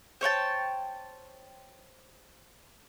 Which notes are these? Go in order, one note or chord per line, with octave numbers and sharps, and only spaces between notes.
C5 C#5 G5 A5